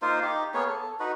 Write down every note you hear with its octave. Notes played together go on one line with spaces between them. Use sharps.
A#3 D#4 F4 C5
D#4 G4
A#3 B3 G#4 C#5
A4
D#4 F#4 B4